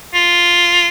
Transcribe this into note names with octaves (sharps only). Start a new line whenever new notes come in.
F4